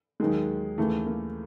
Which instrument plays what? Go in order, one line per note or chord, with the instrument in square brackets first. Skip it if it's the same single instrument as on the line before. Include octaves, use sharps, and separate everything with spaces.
[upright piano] D#2 D#3 F#3 [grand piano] G#3
[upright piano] D#2 C#3 E3 [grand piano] A3
[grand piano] A#3